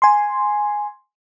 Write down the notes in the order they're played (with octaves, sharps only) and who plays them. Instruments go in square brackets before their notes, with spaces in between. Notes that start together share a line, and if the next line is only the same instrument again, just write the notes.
[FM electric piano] G#5 C6